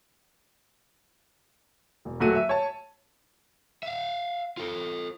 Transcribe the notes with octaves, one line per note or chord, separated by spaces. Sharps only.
E1
D#1 F#3 A3 F#4 D#7
E5
C#5 A5
E5 F5
F4 A4